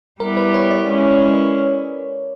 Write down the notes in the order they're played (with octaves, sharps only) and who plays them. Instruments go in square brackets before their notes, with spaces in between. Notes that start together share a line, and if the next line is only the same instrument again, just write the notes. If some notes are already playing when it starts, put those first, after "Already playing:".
[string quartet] G3 B3 E4 G4 [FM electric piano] A#4
[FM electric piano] B4
C#5
D5
[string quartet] G#3 C#4 E4